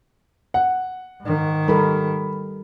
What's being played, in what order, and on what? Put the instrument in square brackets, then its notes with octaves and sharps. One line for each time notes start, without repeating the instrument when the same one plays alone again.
[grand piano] F#5
[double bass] G#2 D#3
[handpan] G3 A4 A#4 [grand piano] B5